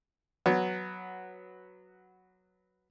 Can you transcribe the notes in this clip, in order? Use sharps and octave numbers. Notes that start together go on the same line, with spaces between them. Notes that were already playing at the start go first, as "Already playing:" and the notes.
F#3 B3